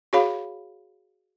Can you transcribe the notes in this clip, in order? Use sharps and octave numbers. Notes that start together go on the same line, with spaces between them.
F#4 G#4 C#5 F5 B5